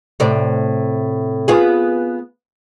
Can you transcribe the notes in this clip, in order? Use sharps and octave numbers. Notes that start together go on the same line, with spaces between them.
A2 C3 D5
B3 F4 G#4